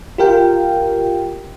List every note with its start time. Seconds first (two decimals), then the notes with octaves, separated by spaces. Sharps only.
0.18 F4 G4 A#4 F5 G5